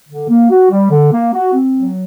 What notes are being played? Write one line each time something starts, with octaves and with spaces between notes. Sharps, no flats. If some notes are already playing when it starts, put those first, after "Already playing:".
D3
A#3
F#4
G3
D3
A#3
F#4
C4
F#3